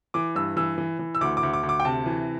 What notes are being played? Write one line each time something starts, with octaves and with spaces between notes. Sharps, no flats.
E3 D6
G2 E6
E3 E6
E3
E3
E6
D2 D6
D6
D2
D6
D2
D6
G5
C3 A5
E3